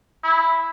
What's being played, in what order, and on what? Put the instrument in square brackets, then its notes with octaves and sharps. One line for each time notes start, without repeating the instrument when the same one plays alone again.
[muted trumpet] E4